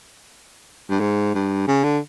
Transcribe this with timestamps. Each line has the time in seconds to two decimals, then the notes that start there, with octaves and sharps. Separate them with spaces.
0.90 G2
1.00 G#2
1.35 G2
1.67 C#3
1.84 D3